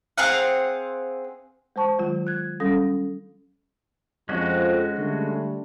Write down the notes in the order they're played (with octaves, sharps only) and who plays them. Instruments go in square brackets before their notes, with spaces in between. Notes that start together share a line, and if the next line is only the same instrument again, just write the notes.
[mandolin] C4 G#4 F5 F#5
[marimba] G#3 C5 A5 C#6
D#3 F#3 G#3 F4
F#6 G#6
G3 C#4 A4 D#6 A#6
[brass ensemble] F2 [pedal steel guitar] G#3 C#4 F#4
[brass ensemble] D3 G3 A3